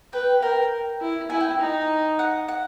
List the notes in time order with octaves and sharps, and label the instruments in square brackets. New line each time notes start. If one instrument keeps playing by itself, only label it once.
[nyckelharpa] B4 [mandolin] G5
[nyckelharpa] A#4 [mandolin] G5
[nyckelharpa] E4
[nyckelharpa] E4 [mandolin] G#5
[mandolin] G5
[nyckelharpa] D#4
[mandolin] F#5
F#5